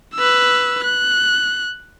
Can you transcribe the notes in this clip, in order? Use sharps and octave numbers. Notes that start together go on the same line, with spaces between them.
B4 E6
F#6